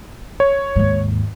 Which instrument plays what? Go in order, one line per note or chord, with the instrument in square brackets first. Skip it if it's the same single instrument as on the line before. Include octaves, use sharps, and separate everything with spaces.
[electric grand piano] C#5
[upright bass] D#2 G#2